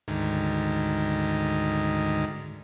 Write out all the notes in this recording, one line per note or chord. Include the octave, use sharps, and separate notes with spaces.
D2 G#2 D#3